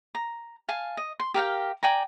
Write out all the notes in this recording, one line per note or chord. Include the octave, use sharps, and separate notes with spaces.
A#5
F5 G#5 A5
D#5
C6
G4 A#4 F5 G5
D5 G5 G#5 A#5